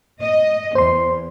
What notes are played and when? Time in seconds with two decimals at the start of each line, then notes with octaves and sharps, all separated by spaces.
0.22 D#5
0.75 E2 C5 C6